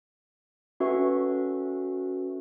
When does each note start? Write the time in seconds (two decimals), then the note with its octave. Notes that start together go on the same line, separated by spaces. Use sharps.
0.80 C#4 F#4 A4 B4 E5 C#6